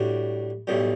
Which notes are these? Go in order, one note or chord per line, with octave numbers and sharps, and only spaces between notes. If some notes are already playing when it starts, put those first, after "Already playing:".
Already playing: A2 G3 D4 F#4
B1 A2 G3